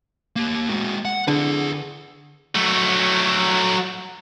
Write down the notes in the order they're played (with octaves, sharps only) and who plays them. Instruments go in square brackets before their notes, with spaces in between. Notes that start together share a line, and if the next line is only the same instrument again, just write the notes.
[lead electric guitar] A#3 G4
G#3 F#4
F#5
[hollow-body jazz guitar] D3 [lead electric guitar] G#4 B4
[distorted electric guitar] F#3 A3